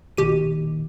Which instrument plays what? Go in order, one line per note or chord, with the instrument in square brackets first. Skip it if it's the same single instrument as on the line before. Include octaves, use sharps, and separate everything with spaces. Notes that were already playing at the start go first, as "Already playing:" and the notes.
[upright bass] A#1 D#3 [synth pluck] B2 G4 D#7